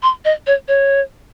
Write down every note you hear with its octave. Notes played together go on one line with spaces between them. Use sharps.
C6
D#5
C#5
C#5